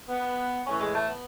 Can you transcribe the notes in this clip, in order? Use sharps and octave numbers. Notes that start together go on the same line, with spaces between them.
B3
A2 E3 C#4
G#3
A3
B3